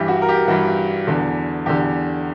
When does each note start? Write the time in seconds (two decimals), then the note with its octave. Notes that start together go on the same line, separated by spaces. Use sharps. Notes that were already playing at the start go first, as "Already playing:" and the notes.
Already playing: G2 E3 G4
0.08 F#4
0.22 A#4
0.28 G4
0.47 G2 E3 F#4
1.07 E2 D3
1.66 E2 D3 G4